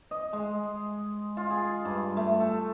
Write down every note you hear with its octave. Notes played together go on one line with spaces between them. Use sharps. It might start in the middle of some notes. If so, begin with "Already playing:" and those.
D#5
G#3
F4
G#4
G2
A3
A4